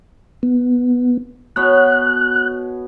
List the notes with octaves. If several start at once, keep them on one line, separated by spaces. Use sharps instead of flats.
B3
B2 B3 C#5 F#6